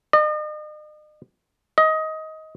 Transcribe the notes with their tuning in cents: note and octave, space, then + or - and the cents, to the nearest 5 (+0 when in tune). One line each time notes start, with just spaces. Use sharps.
D#5 -40
D#5 +20